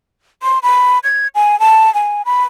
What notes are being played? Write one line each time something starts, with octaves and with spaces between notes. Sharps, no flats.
C6
B5
G#6
G#5
A5
G#5
B5